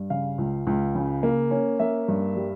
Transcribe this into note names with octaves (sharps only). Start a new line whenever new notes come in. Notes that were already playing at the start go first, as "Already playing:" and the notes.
Already playing: G2
C#3 F5
C#2
C#2
C#3
A#3
C#4
A#3 E5
G2
G3